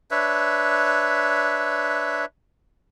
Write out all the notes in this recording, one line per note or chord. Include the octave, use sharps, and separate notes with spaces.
D4 B4 C#5 E5